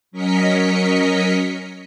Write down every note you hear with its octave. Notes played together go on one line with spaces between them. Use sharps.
F#3 C#4 A#4 D#5 B6 C#7